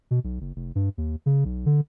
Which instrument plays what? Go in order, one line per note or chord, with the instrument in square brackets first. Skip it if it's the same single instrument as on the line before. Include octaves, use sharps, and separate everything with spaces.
[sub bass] B2
B1
F#1
F1
G2
D#2
C#3
B1
D3